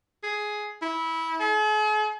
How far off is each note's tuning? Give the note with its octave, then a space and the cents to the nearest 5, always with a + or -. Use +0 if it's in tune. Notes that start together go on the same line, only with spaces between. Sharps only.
G#4 +10
E4 -20
G#4 +45